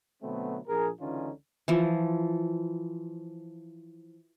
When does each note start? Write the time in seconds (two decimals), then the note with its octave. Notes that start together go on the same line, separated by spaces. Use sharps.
0.22 B2 D3 F#3 A3 B3 C4
0.67 A#1 G#4 A#4
1.00 C#2 D3 E3 C#4 D#4 F4
1.68 E3 F3